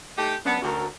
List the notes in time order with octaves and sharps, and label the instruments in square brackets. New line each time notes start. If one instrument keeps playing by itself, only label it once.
[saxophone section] A3 D#4 G4
[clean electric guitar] F#2 D4 [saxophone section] B3
[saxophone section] D2 [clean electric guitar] F#4 G4 A#4